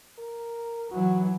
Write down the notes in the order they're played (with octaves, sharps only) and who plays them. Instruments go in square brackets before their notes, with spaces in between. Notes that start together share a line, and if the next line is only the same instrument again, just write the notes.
[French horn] A#4
[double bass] E3 F#3 [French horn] F#4